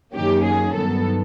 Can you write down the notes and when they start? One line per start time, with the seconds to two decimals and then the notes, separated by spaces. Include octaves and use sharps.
0.14 F#2 D#3 F#3 A#3 C#4 G4
0.44 G#4
0.74 G2 D#3 F#3 B3 A4